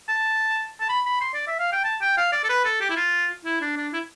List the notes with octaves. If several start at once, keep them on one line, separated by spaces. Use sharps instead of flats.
A5
A5
B5
B5
C6
D5
E5
F5
G5
A5
G5
F5
D5
A4
B4
A4
G4
E4
F4
E4
D4
D4
E4